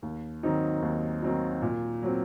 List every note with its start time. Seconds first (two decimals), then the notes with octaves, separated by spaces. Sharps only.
0.02 D#2
0.43 D#3 F#3 C4 D#4
0.82 D#2
1.22 D#3 F#3 C4 D#4
1.62 A#2
2.03 F#3 C4